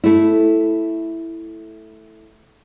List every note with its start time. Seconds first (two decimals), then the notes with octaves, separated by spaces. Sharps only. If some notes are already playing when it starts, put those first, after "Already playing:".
0.04 A3 E4